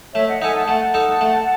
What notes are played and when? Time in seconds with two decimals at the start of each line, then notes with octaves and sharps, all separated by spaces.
0.14 A3 C#5 E5
0.27 D#5 F#5
0.41 D#4 A4 E5 G#5
0.54 F#5 A5
0.68 A3 F#5 A5
0.94 D#4 A4
1.21 A3